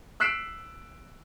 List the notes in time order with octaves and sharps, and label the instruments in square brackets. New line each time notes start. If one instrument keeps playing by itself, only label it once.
[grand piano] E6 F#6 B6 C7 D7 E7